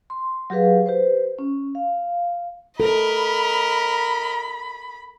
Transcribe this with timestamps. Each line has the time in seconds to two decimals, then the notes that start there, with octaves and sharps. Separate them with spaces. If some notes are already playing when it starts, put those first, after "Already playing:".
0.10 C6
0.50 F#3 G4 G#4 B4 F5
0.86 G4 B4 C5
1.39 C#4
1.75 F5
2.80 A4 A#4 D#5 B5